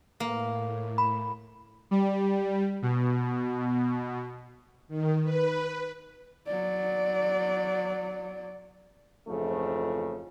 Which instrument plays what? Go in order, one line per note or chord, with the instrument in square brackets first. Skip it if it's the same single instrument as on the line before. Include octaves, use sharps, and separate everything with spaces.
[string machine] A2 [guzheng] A#3
[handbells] B5
[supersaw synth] G3
B2
[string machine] D#3
B4
[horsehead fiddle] F#3 D5
[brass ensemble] F2 G#2 C#3 E3 F3 A3